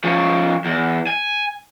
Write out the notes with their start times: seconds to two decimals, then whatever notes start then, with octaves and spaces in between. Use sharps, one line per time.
0.04 F3 C#4
0.65 E2
1.07 G#5